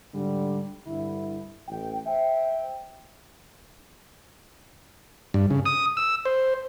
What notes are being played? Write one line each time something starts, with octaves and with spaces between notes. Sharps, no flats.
G#2 D3 G3
G2 D3 E4
A1 G5
C5 E5 G5
G2
C#3
D#6
E6
C5